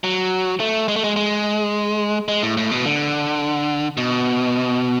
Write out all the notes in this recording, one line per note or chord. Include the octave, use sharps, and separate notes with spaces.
F#3
A3
G#3
A3
G#3
G#3
G#3
A2
A2
B2
D3
B2